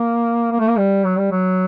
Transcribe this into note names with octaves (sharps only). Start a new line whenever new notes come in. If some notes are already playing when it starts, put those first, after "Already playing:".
Already playing: A#3
A#3
A3
A#3
G3
F#3
G3
F#3